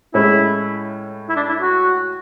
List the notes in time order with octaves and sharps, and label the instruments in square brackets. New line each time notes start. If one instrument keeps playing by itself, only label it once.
[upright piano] A2 G#3 C#4 [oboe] E4
[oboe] E4
D4
E4
F#4